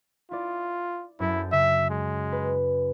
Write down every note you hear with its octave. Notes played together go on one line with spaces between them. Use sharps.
E4 F4 D5
F#2 E4 A4 G6
C#3 E5
G#3
B4